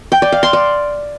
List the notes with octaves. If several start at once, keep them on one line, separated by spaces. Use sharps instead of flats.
G5
D5
F5
C6
D5